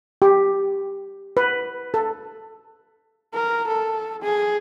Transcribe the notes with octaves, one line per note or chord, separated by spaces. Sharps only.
G4
B4
A4
A#4
A4
G#4